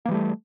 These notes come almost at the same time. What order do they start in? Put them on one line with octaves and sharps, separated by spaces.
A#3 E3 G3 A3